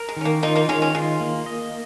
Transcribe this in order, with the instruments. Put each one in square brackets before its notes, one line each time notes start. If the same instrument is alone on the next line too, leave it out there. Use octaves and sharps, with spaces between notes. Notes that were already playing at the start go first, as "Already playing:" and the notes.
Already playing: [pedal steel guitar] A#4
[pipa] G#3
[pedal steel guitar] D#3 [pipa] C#4
[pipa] A#3
[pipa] A#3 D#4 [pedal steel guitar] F4
[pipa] A#3 D#4
[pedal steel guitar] D#3 [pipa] G#3 C#4
[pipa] G#3 C#4
[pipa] G#3 [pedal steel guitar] F4
[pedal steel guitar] A#3
D#5